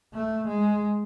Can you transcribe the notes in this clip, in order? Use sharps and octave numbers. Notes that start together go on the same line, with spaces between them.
A3
G#3